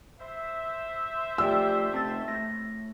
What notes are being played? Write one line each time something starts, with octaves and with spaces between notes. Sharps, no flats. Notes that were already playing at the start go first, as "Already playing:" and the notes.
C5 E5
F3 A3 G4 D5 G5 E6
C3 A3 A5 A6
A2 A#6